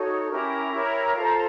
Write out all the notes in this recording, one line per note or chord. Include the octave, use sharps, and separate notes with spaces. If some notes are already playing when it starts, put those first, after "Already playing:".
Already playing: D#4 F#4 A4 C#5
C#4 E4 G4 A#4 A#5
E4 G4 A#4 C#5
F4 A4 C5